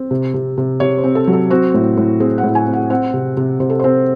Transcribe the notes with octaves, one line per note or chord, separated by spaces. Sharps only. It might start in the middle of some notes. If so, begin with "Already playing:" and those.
Already playing: C4
C3
C3
C3
C3 C#5
C5
C4
A4
F#3
A4
C4 F#4
A2
A2
C4 G#4
F#5
A2
G#5
C4
F#5
C4 F#5
C3
C3
C3 C5
A4
C4 C5